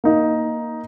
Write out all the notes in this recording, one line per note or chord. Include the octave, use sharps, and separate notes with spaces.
A#3 D#4